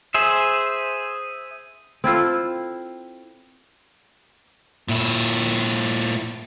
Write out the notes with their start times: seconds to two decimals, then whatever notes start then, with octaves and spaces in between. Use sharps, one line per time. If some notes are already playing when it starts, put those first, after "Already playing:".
0.14 G#4 C5 E5
2.04 C4 E4 F4 A4
4.89 A#2 E4